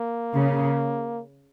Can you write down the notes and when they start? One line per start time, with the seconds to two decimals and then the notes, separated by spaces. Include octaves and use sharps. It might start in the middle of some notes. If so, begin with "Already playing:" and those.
Already playing: A#3
0.34 C#3